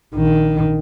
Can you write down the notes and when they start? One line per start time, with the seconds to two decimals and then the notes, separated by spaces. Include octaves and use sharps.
0.13 A#1 D#3